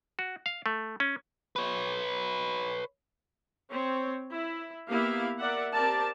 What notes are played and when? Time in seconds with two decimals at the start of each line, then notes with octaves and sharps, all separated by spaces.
0.19 F#4
0.46 F5
0.66 A3
1.00 C#4
1.56 B4 C#5
3.70 C4 C#5
4.33 E4
4.88 A#3 B3 E4 G4 F5
5.38 A#4 D5 E5 F#5
5.73 C4 G4 A#4 D5 A5